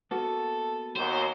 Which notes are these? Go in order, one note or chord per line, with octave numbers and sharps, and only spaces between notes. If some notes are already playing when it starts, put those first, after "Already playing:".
A#3 B3 F#4 A4
D#2 F#3 C5